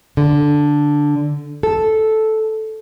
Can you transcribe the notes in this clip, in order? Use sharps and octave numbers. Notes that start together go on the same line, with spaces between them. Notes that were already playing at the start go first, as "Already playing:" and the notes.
D3
A4